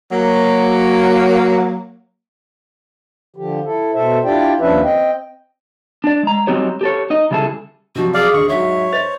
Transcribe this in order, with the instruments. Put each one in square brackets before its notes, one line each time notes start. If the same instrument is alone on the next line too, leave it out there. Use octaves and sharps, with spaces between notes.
[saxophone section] F#3 A#3
[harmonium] D3 F3 G4
E4 A4
B2 A4 C5 E5
D4 E4 F4 G4 D5 G5
D#2 F3 C#4 D4 B4 E5
C4 D#5 G5
[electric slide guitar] D4 D5
G#3 A#5
F#3 G3 C4 D#4 G4 C#5
G4 A4 C#5
D#4 D#5
C#3 G3 E4 G#4 A4
[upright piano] C3 F3 F#3 [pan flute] F#4
[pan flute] G#4 [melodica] D5 F5
[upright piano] D2 [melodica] C#6
[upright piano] G#2 F#3 [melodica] C#5 [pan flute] E5
[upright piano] C5 A6 F7